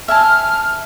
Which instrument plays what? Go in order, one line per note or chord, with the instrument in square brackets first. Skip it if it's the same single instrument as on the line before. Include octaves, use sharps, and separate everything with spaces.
[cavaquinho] E5 G#5 A5 [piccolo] F6